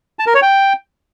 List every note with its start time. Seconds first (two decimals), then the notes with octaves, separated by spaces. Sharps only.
0.19 A5
0.27 A#4
0.34 C#5
0.42 G5